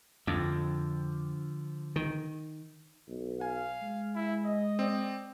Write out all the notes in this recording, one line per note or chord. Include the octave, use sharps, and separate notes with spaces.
F2 D3 F3
D#3
B1
F5 G#5
G#3
E4
D#5
C4 D5